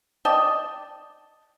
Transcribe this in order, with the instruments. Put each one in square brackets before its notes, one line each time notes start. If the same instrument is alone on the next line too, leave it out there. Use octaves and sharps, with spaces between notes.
[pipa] D5 D#5 G5 A5